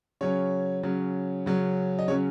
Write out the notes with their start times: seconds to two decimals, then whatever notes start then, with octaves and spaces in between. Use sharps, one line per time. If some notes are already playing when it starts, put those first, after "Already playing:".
0.21 C#3 F#3 C#4 C#5
0.83 C#3 F#3 C#4
1.46 C#3 F#3 C#4
1.99 D#5
2.08 C#3 F#3 C#4 C#5